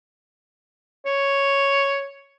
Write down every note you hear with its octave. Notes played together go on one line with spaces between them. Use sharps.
C#5